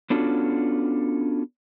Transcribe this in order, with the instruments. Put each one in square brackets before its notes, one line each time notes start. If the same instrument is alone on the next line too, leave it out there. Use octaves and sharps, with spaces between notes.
[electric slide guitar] B3 C#4 D4 F4 F#4 A4